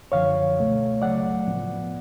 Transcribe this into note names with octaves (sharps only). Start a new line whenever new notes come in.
F#2 D3 F3 C#5 F5
C#2 B2 A3
C#2 C#3 F#3 A3 D5 F#5
A2 F3 B3